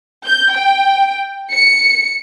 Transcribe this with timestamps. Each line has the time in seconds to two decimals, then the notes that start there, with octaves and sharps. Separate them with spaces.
0.25 G6
0.55 G5
1.50 C#7